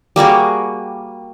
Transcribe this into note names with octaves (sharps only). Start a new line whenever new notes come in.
G3 A#3 F#4 G#4